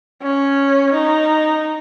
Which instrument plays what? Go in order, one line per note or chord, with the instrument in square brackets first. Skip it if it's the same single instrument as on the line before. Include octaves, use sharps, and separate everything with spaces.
[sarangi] C#4
D#4